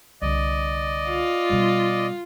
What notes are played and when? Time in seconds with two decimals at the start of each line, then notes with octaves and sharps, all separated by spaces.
0.22 C2 D3 D5 D#5
1.09 F4
1.50 B2 G3